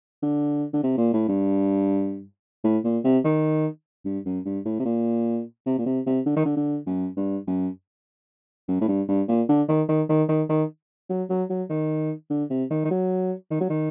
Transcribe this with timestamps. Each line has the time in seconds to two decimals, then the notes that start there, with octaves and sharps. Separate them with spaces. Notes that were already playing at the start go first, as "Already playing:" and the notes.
0.23 D3
0.73 D3
0.83 C3
0.98 A#2
1.13 A2
1.29 G2
2.64 A2
2.84 A#2
3.04 C3
3.25 D#3
4.05 G2
4.26 F#2
4.45 G2
4.65 A2
4.80 C3
4.85 A#2
5.66 C3
5.78 A#2
5.86 C3
6.06 C3
6.26 D3
6.36 D#3
6.45 D3
6.57 D3
6.86 F#2
7.17 G2
7.47 F#2
8.68 F#2
8.81 A2
8.88 G2
9.08 G2
9.28 A#2
9.49 D3
9.69 D#3
9.88 D#3
10.09 D#3
10.29 D#3
10.49 D#3
11.10 F#3
11.30 F#3
11.50 F#3
11.70 D#3
12.30 D3
12.50 C3
12.71 D#3
12.85 D#3
12.91 F#3
13.51 D#3
13.60 F#3
13.70 D#3